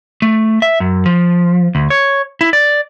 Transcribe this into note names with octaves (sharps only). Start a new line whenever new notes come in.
A3
E5
F#2
F3
D2
C#5
E4
D5